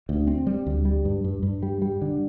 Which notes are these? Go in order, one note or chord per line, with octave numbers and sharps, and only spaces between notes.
D2
C4
G3
D2
G3
G2
G2
G2
G3
G3
D3